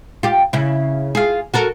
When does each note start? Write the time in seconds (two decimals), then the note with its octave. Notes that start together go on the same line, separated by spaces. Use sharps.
0.23 F4 G4
0.53 C#3 E4
1.15 F4 G#4
1.54 F#4 A4 A#4